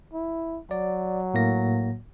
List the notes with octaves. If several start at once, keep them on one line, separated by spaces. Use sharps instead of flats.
E4
F#3 D5
A2 A#3 A#6